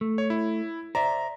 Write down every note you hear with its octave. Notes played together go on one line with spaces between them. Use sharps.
A3
C#5
E4
C5 D5 E5 A#5